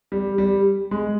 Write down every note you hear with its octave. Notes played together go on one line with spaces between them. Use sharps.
G3
G3
G#3